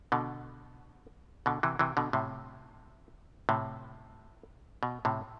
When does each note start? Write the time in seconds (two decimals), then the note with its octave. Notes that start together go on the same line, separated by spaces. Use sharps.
0.12 B2 D3
1.46 B2 D3
1.63 C3 E3
1.79 C3 E3
1.97 B2 D3
2.13 A2 C3
3.49 A2 C3
4.83 B2
5.05 A2 C3